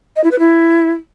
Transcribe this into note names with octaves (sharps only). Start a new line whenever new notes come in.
D#5
E4
B4
E4